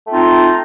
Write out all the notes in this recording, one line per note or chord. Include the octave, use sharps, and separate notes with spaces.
A3 C4 D#4 F4